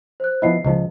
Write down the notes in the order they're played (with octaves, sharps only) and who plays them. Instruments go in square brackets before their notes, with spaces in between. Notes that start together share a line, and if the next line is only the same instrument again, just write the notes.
[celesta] C5 F#6
[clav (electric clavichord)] F3 B3 E4 [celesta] D#5 C7
[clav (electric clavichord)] C#2 F3 [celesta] D#5